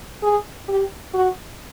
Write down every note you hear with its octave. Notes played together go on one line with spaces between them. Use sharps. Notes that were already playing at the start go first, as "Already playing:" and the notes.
G#4
G4
F#4